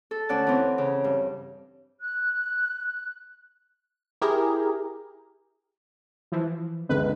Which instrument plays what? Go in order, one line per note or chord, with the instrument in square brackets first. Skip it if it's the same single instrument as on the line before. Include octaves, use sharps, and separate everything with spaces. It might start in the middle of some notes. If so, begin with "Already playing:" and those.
[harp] A4
D2 C#4 D5 F#5 A5
E3 C4
C#3
G2
[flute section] F#6
[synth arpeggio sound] E4 G4 G#4 A#4
[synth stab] E3 F3
[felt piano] G1 C#2 D3 [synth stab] B4